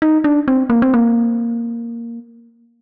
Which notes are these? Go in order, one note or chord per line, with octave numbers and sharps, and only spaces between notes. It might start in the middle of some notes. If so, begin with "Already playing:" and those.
D#4
D4
C4
A#3
C4
A#3